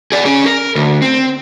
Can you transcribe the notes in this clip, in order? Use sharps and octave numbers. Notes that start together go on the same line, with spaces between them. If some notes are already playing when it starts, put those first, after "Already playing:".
G#4 D5
C#4 G#4
A#4
D2
C4